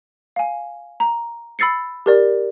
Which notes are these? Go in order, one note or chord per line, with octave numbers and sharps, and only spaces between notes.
F5 G#5
A#5
B5 E6 A6 C7 C#7
G4 A#4 D5